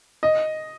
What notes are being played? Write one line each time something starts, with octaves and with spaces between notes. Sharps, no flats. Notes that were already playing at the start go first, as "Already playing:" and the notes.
D#5